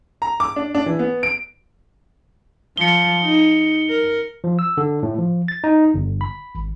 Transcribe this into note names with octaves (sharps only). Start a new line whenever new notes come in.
A#5
D6
D4
D4
E3
B3
D7
F3 C#7 G7
D#4
A#4
F3
E6
D3
A2
F3
A6
D#4
G1
B5
G#1